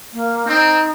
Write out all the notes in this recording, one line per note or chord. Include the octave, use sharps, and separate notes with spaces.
A#3
C4 D#4